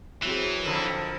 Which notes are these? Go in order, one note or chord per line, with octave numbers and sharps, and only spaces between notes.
E3 F#3 C4 G#4
F2 D3 A#4